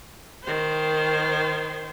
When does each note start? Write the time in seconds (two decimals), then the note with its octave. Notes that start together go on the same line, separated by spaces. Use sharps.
0.43 D#3 C5